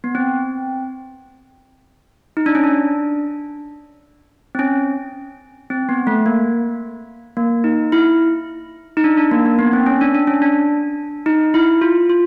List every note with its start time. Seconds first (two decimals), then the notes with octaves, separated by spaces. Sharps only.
0.04 B3
0.15 C4
2.37 D#4
2.46 D4
2.55 C#4
2.64 D4
4.55 C4
4.59 C#4
5.70 C4
5.89 B3
6.07 A3
6.26 A#3
7.37 A#3
7.64 D#4
7.92 E4
8.97 D#4
9.04 D4
9.18 D4
9.31 A#3
9.45 A#3
9.59 B3
9.73 C4
9.86 C#4
10.01 D4
10.15 D4
10.27 C#4
10.42 D4
11.26 D#4
11.54 E4
11.81 F4
12.10 F4